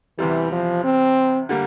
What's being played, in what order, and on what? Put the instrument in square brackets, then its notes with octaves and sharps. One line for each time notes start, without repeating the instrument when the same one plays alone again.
[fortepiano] E2 C3 G3 [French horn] E3
[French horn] F3
C4
[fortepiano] D3 G3 A#3